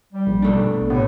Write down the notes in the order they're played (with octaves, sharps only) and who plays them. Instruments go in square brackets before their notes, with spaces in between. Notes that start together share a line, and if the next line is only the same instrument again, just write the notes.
[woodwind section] G3
[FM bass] A#1
[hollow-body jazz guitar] B2 A3 D4
[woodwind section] A2 [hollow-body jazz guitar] C3 [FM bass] B3